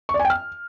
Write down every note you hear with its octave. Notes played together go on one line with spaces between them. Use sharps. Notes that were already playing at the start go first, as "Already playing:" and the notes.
C#6
D5
G#5
G5
F6